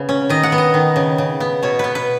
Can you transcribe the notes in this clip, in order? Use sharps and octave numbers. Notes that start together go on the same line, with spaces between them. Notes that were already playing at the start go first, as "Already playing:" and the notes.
Already playing: C#3 B3
C#4
D#3 D#5
F#5
B3
D#5
D#3
C#3
C#3
B3
B2 C#5
B3 B4
B4